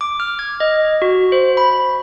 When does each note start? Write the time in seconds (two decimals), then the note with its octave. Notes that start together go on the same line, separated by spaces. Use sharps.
0.01 D6
0.20 F6
0.39 G#6
0.60 D#5
1.02 F#4
1.32 C5
1.57 B5